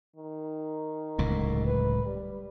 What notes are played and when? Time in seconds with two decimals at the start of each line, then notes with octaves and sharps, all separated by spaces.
0.16 D#3
1.18 D1 C#2 A2
1.65 B4
2.06 G3